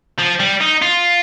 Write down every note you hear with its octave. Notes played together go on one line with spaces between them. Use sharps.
F3
G3
D#4
F4